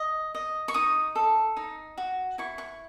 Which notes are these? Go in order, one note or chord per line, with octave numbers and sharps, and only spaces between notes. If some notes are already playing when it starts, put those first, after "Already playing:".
Already playing: D#5
D#5
C#6
D#4 D#6
A4
D#4
F#4
E4 C#6
C#6